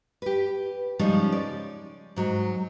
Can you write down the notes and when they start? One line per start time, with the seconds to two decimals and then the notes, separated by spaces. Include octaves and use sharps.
0.22 G4 B4
0.99 C#3 F3 G3 G#3 C#4 D#4
1.32 D5
2.16 G#2 F#3